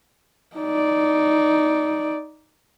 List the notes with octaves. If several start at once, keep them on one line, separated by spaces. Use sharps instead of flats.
D#4 D5